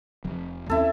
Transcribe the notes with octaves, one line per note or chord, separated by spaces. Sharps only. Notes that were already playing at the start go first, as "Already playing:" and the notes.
F1 F2
D#2 C4 C#4 E4 A4